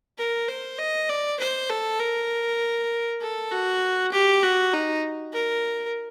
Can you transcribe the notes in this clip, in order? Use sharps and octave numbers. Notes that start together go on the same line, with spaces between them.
A#4
C5
D#5
D5
C5
A4
A#4
A4
F#4
G4
F#4
D#4
A#4